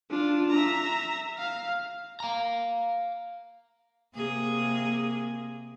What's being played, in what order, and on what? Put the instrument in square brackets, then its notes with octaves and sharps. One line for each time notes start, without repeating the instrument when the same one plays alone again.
[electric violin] D4 F4
E5 A#5
F5
[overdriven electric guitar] F5 A#5
[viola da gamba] C3 A#3 G#4